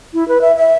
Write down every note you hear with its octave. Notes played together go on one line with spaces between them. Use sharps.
E4
B4
E5
E5